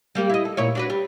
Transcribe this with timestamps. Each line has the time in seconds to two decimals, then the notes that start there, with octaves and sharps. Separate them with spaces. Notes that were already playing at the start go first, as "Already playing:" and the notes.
0.15 G3 A#3 G4
0.29 E4 D#5
0.45 A4
0.57 A#2 E4 C#5
0.75 D4 F#4 B4
0.90 G3